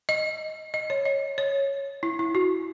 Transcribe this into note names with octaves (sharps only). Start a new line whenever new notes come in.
D#5
D#5
C#5
D#5
C#5
E4
E4
F#4